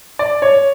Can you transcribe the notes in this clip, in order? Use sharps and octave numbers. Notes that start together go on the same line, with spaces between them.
D5
C#5